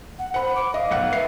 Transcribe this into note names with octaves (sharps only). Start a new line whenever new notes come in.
F#5
C5 F#5 B5
D6
D#5 F5
B1 F#5 F#6
B3 E5 C7